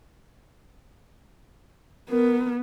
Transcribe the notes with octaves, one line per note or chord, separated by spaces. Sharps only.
B3 A#4